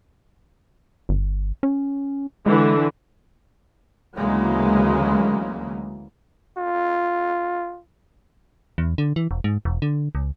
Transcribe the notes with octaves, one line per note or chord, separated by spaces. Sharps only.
G1
C#4
D3 E3 G#3
D2 C#3 E3 F#3 G#3 A#3
F4
E2
D3
E3
E1
G#2
E1
D3
C#2